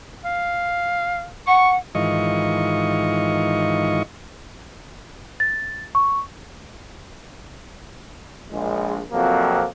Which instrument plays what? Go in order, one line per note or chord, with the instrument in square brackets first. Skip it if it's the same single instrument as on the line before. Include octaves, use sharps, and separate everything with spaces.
[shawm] F5
[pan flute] F#5 [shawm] C#6
[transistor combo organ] G#2 D#3 E3 F4 D#5 C#6
[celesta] A6
C#6
[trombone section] A#1 G#3
F2 C3 F3 F#3 A#3